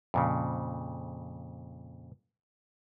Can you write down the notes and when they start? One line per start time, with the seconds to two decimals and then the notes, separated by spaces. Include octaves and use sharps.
0.14 F2 A#2 C#3